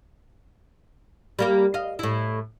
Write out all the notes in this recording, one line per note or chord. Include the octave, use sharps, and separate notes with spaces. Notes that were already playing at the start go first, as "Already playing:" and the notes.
G3 A#3 G4
D#5 F5
A2 E4